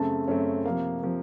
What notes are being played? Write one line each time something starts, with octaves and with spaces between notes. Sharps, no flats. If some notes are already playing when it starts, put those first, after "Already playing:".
Already playing: F#2 C#3 A3 C4 A5
F#2 C#3 A3 C4 C#5
C3 F3 A#3 F5
C3 F3 A#3